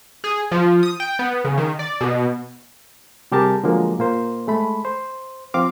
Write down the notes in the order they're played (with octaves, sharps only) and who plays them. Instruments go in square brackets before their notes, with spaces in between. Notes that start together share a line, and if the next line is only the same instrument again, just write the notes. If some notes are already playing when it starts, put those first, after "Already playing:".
[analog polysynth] G#4
F3
D#6
G5
B3
C#3
D#3
D5
B2
[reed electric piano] C3 G3 G4 G#4 A#4 A5
D3 F3 F#3 G#3 A#3
A#2 A#3 C5
G#3 A3 B5
C5
F3 C4 F5 D6